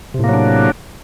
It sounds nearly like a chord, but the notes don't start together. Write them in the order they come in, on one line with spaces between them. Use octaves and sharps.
C3 A2 A#3 F#3 D4